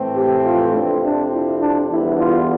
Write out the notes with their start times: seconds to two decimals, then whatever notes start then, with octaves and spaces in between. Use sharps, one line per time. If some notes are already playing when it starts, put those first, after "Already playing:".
Already playing: A2 E3 A3 C4
0.15 G4
0.46 F4
0.74 F2 C3 F3 C4 D4
1.04 D4
1.33 E4
1.62 D4
1.90 E2 D3 G3 B3 E4
2.20 F4